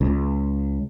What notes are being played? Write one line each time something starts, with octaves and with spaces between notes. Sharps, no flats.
C#2